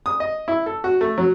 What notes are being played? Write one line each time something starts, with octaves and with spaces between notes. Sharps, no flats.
D#6
D#5
E4
A4
F#4
A3
F#3